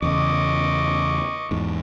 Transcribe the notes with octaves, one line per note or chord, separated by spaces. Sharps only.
E2 C#3 D#5 C#6 D6
E2 G#2